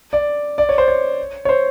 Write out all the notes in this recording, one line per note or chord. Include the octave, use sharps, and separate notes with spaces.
D5
D5
C#5
C5
C#5
C#5
C5